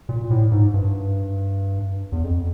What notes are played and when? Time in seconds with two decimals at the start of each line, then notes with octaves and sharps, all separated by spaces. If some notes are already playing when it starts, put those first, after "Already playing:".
0.09 A#2
0.31 A2
0.52 G#2
0.74 G2
2.12 E2
2.23 F2